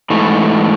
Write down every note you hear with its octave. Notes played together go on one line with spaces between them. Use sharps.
G#2 E3 A3